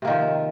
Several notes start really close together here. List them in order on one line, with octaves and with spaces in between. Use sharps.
C3 A#3 D#3 F3